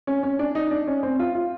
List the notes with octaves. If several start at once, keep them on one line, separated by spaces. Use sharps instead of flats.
C#4
C#4
D4
D#4
D4
C#4
C4
F4
F4